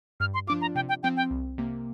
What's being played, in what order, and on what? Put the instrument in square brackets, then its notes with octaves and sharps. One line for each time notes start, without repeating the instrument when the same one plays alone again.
[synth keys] G2 [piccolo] F6
[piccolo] C6
[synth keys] F3 D4 F4 [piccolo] D6
[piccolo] A#5
[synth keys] C3 [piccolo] G5
[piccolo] G5
[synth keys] F3 C4 [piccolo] G5
[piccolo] G5
[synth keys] C2
C3 A#3